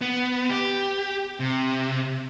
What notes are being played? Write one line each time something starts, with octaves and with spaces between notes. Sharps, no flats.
B3
G4
C3